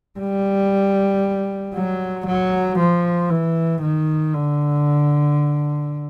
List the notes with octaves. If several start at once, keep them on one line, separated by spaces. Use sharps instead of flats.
G3
F#3
F#3
F3
E3
D#3
D3